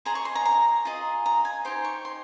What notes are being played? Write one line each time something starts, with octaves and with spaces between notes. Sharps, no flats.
G#4 C5 D#5 A#5
C#6
C6
A#5
A#5
F4 G#4 D#5
A#5
G#5
D#4 G4 C5 C6
C#6
C6